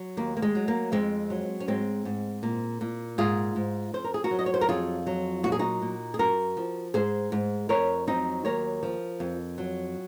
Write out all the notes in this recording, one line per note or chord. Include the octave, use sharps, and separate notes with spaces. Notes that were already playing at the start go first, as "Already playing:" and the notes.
Already playing: F#3
D#2 A#3
A#3
G#3
F#3
A#3
F2 G#3 C4
F#3
C#4
G#2 G#3 C4
G#2
A#2
A#2
G#2 F4 G#4
G#2
F2 C5
A#4
G#4
F#4 A#4
F#3
D#5
C#5
C5
A#4
F2 F4 G#4
F#3
A#2 F#4
G#4
D#4 F#4
A#2
G#4
F#2 F#4 A#4
F3
G#2 G#4 C5
G#2
F2 A#4 C#5
F#3 C4 D#4
D#2 A#4 C#5
F3
F2
F#3